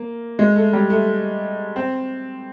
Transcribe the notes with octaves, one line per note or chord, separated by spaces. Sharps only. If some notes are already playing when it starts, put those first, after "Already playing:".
Already playing: A#3
G#3
A3
G3
A3
C4